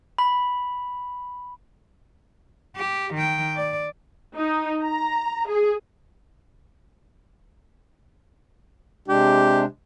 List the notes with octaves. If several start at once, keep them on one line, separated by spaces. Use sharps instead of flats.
B5
G4
D#3 G5
D5
D#4
A#5
G#4
C3 G#3 D4 G4